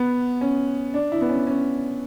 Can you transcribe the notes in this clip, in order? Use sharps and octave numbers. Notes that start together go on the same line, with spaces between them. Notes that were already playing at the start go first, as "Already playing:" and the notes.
Already playing: B3
C#4
D4
E4
B3
C#4
C#4